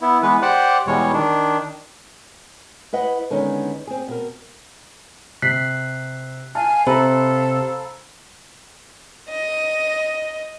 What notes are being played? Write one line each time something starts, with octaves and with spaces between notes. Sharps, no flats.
B3 E4
E3 G#3 B3 B4
G4 C5 D5 F#5
E2 B2 G3 G#3 C#5
D#3 D4
E4 B4 D#5 F#5
D3 D#3 G#3 B3 C#4 D#4
C4 G#4
B2 A#4
C3 F#6 B6 C7
F5 G#5 A5 F6
C3 A4 C5 F5 A#5 B5
D#5